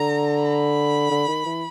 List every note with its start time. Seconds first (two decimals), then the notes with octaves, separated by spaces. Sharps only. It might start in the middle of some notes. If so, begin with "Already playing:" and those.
Already playing: D3 A#5
0.43 B5
1.11 D3
1.28 D#3
1.45 E3